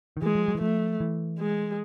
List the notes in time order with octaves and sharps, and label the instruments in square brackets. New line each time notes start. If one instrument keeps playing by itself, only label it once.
[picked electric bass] D#3
[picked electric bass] E3 [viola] G#3
[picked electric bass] F3
F#3
E3
[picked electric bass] F3 [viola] A3
[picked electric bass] E3
[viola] G#3